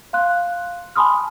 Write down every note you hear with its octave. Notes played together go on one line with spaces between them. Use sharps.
F5 C6 F#6
G#5 A5 B5 C6 D#6 F6